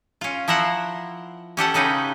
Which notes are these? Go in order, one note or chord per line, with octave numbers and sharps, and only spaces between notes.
C#4 F4
F3 E4 A#4 C5 F#5
C#4 G4 A4 F#5
C#3 C#4 D#4 B4 G5